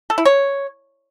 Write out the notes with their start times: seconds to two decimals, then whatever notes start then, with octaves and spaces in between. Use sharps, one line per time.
0.10 A4
0.18 E4
0.25 C#5